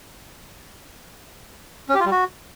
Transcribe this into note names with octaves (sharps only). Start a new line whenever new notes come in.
C#4
G4
F4
G3
F#4